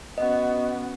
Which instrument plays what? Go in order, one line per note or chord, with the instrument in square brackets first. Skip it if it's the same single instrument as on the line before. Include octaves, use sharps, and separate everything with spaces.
[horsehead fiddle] B3 F#4 [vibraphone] C#4 F#5 [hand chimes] D#5